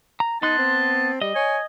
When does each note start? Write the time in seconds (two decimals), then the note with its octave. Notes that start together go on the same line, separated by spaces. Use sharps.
0.20 A#5
0.42 B3 D#4 A5 C6 F#6
0.58 C4
1.22 G3 D#5
1.35 C#5 G#5